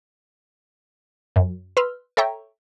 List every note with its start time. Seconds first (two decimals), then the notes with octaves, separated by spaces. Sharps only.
1.36 F#2
1.77 B4 C6 E6 F6
2.17 A4 C#5 E5 G5 A#5 C#6